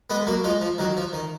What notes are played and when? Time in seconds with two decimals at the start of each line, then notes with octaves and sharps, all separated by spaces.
0.10 G#3 B3
0.27 F#3 A#3
0.44 F3 G#3
0.61 F3
0.78 D#3 F#3
0.97 F3
1.13 D#3